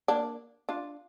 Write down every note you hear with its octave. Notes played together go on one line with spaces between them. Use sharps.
A#3 D4
D4 F4